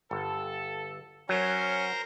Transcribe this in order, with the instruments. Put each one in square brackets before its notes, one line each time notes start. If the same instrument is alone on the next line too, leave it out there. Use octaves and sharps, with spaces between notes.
[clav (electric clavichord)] G1 [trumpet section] A4
[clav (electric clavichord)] F#3 [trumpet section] C#4 [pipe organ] A#4 C5 A#5